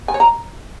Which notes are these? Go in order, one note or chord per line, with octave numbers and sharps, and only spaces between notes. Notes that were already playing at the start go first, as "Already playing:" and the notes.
G#5
C#5
A#5